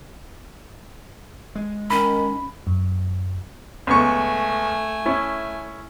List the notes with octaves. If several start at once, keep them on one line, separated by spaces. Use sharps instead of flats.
G#3
D#3 C#4 B5
F#2
C#2 A3 B3 G#5 C#6
C#4 E4